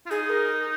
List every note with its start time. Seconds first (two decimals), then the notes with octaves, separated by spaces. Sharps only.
0.06 F4
0.10 D#4 G#4
0.30 A#4